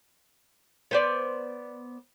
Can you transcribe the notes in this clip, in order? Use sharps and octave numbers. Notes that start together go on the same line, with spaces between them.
B3 C5 D5